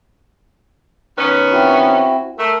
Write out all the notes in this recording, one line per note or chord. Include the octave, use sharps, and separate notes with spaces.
D#3 B3 C#4
C4 E4 F#4
A3 A#4